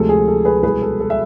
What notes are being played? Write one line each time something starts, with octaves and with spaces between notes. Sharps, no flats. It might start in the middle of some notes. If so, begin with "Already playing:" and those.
Already playing: D2 C3 F3 G#3 A4
G#4
A4
G#4 B4
C2 B2 G#3 G#4 B4
A4
A4
E5